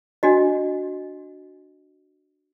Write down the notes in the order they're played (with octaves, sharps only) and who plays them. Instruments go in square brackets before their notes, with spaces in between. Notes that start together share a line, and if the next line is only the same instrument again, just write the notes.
[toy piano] D4 F#4 D#5